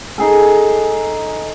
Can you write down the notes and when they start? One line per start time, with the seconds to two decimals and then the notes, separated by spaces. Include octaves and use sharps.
0.18 D#4 G#4 A4